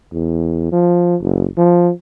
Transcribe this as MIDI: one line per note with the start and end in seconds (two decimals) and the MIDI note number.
0.13 0.69 40
0.72 1.15 53
1.21 1.46 30
1.57 1.91 53